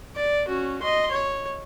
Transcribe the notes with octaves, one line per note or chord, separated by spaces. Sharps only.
D5
C#4 F#4
D#5 C6
C#5